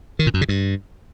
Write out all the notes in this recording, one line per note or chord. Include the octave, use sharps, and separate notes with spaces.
D#3
A#2
F#2
C#3
G2